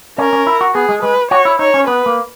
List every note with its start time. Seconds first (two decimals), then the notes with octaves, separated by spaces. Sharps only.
0.18 C#4 A#4
0.33 C#4
0.47 E4
0.61 F#4
0.75 B3 G#4
0.89 G#3
1.03 G#3 B4
1.31 F#4 C#5
1.45 E4
1.59 D#4 C#5
1.74 C#4
1.87 B3 B4
2.06 A#3